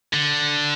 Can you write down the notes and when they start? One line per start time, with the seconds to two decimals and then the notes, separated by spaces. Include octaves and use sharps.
0.13 D3